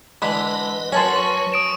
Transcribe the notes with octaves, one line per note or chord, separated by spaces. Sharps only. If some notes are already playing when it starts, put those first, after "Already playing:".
D3 E3 G#3 B4 D#5 B5
F#2 F#3 C#4 B4 C#5 G#5 A5 C6
C#6
D#6 D7 E7